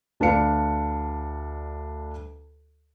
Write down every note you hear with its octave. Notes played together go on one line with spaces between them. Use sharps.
D2 D4 B4 F5 C#7